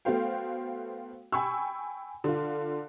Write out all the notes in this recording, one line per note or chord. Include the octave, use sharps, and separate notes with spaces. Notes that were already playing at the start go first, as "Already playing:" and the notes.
A3 B3 F#4 C5 F5 G5
G5 G#5 B5 C#6 E6
D3 F4